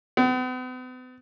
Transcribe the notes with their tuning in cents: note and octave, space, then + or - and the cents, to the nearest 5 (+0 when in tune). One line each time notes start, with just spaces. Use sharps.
B3 +45